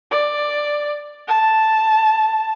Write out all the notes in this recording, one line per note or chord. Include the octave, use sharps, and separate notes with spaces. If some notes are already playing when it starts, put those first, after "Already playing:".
D5
A5